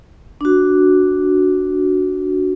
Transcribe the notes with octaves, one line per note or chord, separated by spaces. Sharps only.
D4 F#4